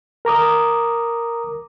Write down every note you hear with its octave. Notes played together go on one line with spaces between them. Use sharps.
A#4 A#5 D6 D#6